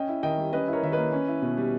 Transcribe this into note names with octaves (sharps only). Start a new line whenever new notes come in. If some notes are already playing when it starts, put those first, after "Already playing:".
Already playing: C#4 D#5 G5
E4
D#3 D#5 G5
G3
C#4 B4 D#5
E4
A#4 C#5
D#3 E5
A#3 B4 D#5
C#4
E4
B2
G3